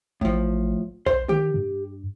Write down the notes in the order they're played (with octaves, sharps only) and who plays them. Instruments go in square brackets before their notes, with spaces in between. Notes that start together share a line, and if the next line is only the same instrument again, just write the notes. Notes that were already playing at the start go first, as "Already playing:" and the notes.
[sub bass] A1 [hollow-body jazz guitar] A2 F3
[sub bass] B1 [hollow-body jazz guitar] C5 C6
[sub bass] D#3 [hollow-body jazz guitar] G4
[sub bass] G2